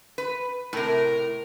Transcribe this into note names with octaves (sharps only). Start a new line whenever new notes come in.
B4
A2 C3 A#4